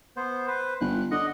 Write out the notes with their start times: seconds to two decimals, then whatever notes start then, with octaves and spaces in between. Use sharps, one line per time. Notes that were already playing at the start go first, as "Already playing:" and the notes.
0.16 B3 C5
0.47 B4 C5
0.81 G1 F#6
1.11 D3 D#5 F#5